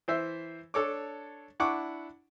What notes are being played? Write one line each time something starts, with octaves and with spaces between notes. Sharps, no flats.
E3 C5 E5
D4 A4 C#5 D6
D4 E4 F#5 C#6 D6